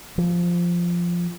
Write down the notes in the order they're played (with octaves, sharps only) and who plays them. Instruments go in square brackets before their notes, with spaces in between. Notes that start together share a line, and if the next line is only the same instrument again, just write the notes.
[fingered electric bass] F3